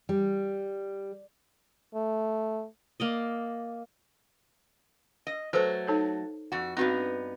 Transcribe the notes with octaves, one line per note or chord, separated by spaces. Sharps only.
G3
A3
A#3 D5 D#5
D#5
F#3 A3 A4 B4 C5
D#4 A4 C#5
F2 F#4
G2 B3 C4 D#4 F#4